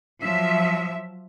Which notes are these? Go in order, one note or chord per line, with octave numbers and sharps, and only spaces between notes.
F3 F#3 E5